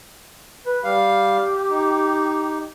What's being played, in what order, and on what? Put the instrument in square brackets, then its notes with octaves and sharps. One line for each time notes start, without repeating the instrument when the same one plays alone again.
[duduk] B4
[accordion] G3 F5 [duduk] G4
[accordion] D#4